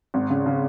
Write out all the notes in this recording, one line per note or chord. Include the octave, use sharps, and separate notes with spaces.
G#1
C#3
C#3